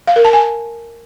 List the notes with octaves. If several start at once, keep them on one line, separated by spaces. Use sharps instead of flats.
F5
A#4
A5
G#5